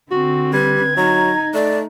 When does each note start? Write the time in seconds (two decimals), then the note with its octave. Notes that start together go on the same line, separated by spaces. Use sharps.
0.11 D3 C4 F#4
0.53 G3 B4 G#6
0.97 F#3 D#4 A#5
1.54 A3 D5